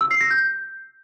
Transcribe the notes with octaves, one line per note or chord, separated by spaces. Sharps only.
E6
C7
A#6
G6